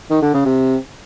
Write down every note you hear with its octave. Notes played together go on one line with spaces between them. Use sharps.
D#3
D3
C#3
C3